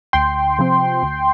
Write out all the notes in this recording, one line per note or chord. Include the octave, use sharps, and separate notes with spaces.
D2 G5 C6
C3 F3 C4
D2